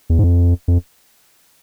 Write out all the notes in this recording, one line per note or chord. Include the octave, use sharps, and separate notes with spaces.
E2
G#2
F2
F2